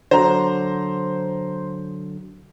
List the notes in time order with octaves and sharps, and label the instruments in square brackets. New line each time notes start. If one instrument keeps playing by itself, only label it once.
[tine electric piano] D3 F#3 [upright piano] C5 A#5